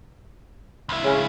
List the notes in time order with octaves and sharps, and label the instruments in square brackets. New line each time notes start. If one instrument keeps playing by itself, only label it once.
[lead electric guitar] C#2 E4
[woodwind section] C#3 C#4